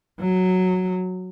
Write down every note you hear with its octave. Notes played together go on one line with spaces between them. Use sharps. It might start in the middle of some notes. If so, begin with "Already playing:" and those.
F#3